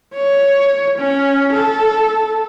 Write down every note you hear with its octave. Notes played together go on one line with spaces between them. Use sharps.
C#5
C#4
A4